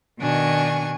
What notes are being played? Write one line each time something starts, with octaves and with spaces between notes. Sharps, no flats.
B2 D#3 D4 G#5 C#6